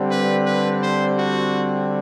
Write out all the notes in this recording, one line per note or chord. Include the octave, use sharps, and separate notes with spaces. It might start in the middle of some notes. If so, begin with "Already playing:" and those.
Already playing: D3 G3 C4
B4
B4
C5
F#4